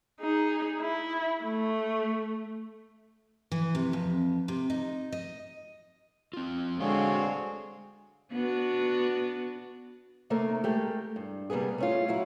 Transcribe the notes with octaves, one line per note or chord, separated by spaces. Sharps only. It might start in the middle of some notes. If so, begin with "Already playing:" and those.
D#4 G#4
E4
A3
E3
C3
F2
C3
D#4
D#5
C4 F4
D3 G#3 C4 F#4 G#4 C#5 D#5 F5
B3 D4 F#4
C3 D#3 A3 A#3 A#4
G#3 A3 G4 A#4
G2
C3 G3 A#3 B3 G#4
A3 C#4 F4
F#3 E4 F#4